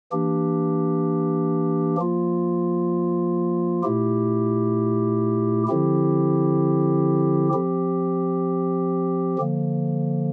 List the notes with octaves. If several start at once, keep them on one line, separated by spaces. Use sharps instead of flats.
E3 A#3 D4 G4
F3 A#3 F4
A#2 A3 E4 G4
D3 F3 C4 E4 G4
F3 C4 G4
D3 F3 A#3